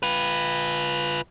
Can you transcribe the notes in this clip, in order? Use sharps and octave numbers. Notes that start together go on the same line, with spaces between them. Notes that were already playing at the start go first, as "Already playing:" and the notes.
F4 B4